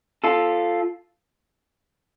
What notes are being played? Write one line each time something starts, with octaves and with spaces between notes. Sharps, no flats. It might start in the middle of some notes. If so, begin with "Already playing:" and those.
F4 A4